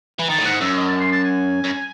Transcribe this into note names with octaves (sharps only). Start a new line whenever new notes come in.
E3
D#3 A5
A2
G#2 F#5
F#2 E5
D#5
A5
C6
A5
G#5
F#2